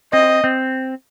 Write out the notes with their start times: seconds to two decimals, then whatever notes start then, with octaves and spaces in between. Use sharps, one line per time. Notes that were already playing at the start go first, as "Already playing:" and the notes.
0.13 C4 D#5
0.44 C4